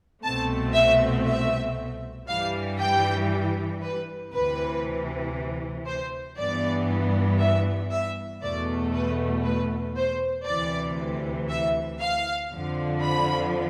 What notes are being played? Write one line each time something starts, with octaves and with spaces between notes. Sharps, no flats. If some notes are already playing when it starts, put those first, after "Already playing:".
C2 B2 A3 C4 A5
E5
E5
G2 E3 G3 F5
G5
B4
D2 C3 E3 B4
C5
G2 E3 B3 D5
E5
E5
E2 B2 A3 D5
B4
B4
C5
D2 C3 E3 D5
E5
F5
F2 D3 F3
B5